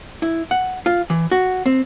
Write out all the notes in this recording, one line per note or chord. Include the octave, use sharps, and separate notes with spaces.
E4
F#5
F4
E3
F#4
C4